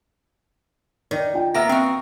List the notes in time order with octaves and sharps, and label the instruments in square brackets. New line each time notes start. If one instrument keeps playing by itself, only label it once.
[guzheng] D#3 [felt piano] D5
[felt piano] F4 G5
[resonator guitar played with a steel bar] A#3 B3 E5 [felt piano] A#5 [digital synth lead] A#6
[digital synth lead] C4 [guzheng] F#4 F5